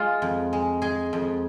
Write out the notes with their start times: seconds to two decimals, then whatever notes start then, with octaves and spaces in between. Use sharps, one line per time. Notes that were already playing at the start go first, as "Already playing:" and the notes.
Already playing: G#3 F4
0.22 F2
0.53 G#3
0.82 G#3 G#4
1.13 F2